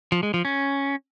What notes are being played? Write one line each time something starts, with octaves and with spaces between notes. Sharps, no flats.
F3
G#3
F3
C#4